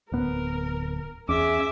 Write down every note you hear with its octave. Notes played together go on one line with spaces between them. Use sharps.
D1 B3 A#4
E2 C#4 G#4 E5 D6